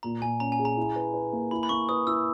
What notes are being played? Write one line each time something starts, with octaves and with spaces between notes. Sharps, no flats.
A#2 A#5
A#2 G#5
C#4 A#5
G#5
G#4
A#5
E4
B4
B4
A#3
E4 B5
B5
A#3 C#6
B4 D#6
E4 E6